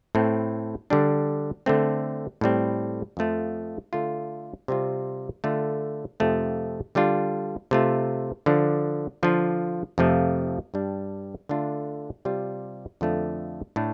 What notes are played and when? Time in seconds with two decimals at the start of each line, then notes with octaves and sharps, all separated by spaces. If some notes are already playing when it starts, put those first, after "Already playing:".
0.15 A2 A3 C4
0.90 D3 G3 D4
1.66 D3 A3 C4
2.41 A2 G3 C4
3.17 F2 F3 A3 F4
3.93 D3 A3 F4
4.68 C3 G3 C4 F4
5.44 D3 A3 F4
6.20 F2 C3 F3 A3 C4
6.95 D3 G3 D4 F4
7.71 C3 A3 F4
8.46 D3 F3 D4
9.23 D3 F3 D4 F4
9.98 F2 C3 F3 A3
10.74 G2 G3 D4
11.49 D3 A3 D4 F4
12.25 C3 G3 F4
13.01 F2 D3 F3 A3 D4
13.76 A2 A3 D4